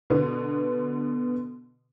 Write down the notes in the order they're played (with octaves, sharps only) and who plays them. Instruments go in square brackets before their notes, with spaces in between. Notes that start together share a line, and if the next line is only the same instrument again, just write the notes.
[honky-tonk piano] B2 D3 B3